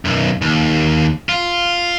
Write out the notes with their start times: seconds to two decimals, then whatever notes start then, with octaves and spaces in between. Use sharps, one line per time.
0.05 B1 F#2
0.42 D#2
1.29 F4